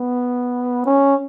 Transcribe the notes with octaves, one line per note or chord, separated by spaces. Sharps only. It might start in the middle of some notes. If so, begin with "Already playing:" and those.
Already playing: B3
C#4